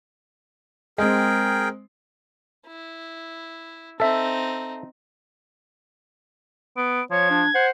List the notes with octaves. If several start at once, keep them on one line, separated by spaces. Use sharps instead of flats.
G#3 C4 G#4 A#4 G5
E4
C4 D#4 A4 E5
B3 D7
F3 C#5 G#6
D4
C5 F#5